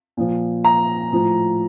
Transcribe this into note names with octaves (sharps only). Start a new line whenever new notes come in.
A#2 F3
A#5
A2 F3